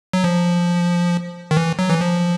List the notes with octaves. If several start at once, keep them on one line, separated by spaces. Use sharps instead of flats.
F#3
F3
D#3
E3
F#3
E3
F3